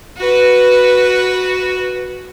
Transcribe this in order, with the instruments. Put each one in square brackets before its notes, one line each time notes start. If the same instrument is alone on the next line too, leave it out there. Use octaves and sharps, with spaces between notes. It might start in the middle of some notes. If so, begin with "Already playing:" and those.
[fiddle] F#4 B4